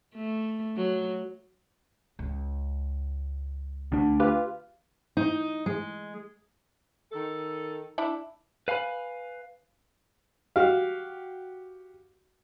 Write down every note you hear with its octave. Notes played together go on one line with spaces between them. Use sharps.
A3
F#3
C#2
D2 A3 D4
F4 G4 B4
D#4
G#3
D#3 A4
D4 E4
B4 F5 G#5 B5
F#4 G4 F5